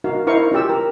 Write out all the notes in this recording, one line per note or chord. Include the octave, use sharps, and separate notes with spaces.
D#4 F#4 A#4 F5
D#4 E4 A#4 C5 F5 C#6
C#4 F4 G4 E6
A#4